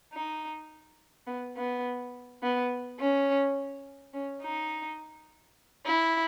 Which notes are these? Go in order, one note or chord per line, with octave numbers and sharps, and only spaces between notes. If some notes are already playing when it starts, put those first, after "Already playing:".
D#4
B3
B3
B3
C#4
C#4
D#4
E4